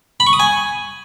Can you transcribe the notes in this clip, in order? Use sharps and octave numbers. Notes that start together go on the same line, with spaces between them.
B5
C#6
D#6
G#5